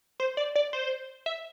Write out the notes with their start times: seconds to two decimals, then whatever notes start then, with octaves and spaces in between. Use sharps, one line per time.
0.20 C5
0.37 D5
0.55 D5
0.73 C5
1.26 E5